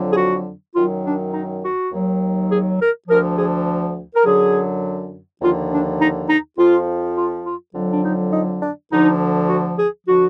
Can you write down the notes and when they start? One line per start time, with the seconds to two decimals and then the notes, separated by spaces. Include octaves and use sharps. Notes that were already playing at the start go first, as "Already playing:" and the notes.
Already playing: F2 D3 F#3
0.11 G#4
0.17 F#4
0.75 F#2 D#3 F#3 F4
1.05 D4
1.33 D#4
1.63 F#4
1.91 D#2 D#3 F#3
2.50 G#4
2.80 A#4
3.08 D2 D3 F3 A#4
3.37 G#4
4.15 A#4
4.24 F#2 D3 F#3 G#4
5.41 D#2 D3 F3 F4
5.71 D4
6.00 D#4
6.28 D#4
6.57 F2 F3 F4
7.17 F4
7.45 F4
7.74 F2 D3 F#3
7.93 D4
8.03 D#4
8.32 D#4
8.61 D4
8.90 D2 D3 F3 D#4
9.48 F#4
9.78 G#4
10.07 D3 F3 F#4